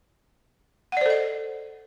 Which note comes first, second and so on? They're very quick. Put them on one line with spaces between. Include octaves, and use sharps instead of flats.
F#5 D5 C5 A4 D#5